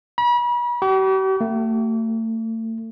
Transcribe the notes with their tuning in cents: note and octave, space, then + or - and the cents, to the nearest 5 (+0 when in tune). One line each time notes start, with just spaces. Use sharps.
B5 -40
G4 -45
A3 +35